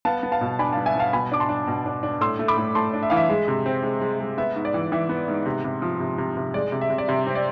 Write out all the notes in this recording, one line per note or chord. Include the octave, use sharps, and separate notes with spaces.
B3 F5 A5
B3
F5 A5
B2
D4 G#5 B5
F5 A5
B3
E5 G#5
B3 F5 A5
B2 G#5 B5
D4 D6
A5 C6
D4
B2
D4
D4
A2 C6 E6
A3
B5 D6
A2
A2 A5 C6
D4
E5
E3 F5
E5
G#3
C3
C4
G#3
G#3
G#3
B3 E5
G#2
D5
E3
E3 E5
B3
G#2
C3
C3
F3
C3
C3
C3
G#3 D5
C3
E5
C3
D5
C3 E5
C4
D5